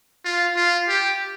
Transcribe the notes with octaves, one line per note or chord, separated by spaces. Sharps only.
F4
F4
G4